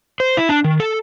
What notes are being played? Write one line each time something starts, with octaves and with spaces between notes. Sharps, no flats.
C5
E4
D4
D#3
A4